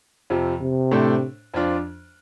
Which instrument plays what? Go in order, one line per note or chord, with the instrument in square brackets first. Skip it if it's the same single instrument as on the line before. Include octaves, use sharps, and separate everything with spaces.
[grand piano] F2 C3 F3
[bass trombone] C3
[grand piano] A2 A3 D4 A4 C5
F2 F3 D4 F4